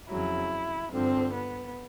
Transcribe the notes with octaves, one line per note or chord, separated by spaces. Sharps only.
F2 C#3 F#3 E4
G2 D3 F3 C4
B3